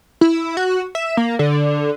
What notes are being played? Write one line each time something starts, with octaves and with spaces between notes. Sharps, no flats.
E4
F#4
E5
A#3
D3